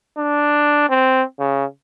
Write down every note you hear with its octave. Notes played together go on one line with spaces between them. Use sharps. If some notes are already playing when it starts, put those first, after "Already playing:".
D4
C4
C#3